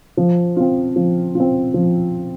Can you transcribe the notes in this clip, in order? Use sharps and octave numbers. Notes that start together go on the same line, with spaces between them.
F3
C4 F4
F3
C4 F4
F3